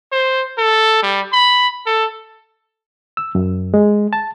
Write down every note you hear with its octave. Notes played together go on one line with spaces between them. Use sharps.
C5
A4
G3
B5
A4
E6
F#2
G#3
A5